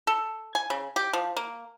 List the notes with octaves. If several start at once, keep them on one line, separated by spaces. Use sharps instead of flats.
A4
G#5
C#3
G4
F3
A#3